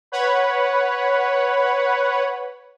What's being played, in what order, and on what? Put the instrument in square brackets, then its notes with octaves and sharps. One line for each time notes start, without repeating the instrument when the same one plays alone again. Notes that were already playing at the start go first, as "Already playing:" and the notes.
[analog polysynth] B4 C#5 F#5 B5